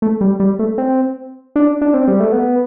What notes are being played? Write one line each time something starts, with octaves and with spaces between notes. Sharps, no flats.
A3
G3
G3
A3
C4
D4
D4
C4
G3
A3
B3